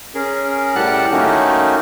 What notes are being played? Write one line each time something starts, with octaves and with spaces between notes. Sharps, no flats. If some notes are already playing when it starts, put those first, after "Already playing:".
C#4 G#4 A#4
A2 G3 G4 F#5 A5 F#6
D#3 A3 A#3 C#4 D#4 F#4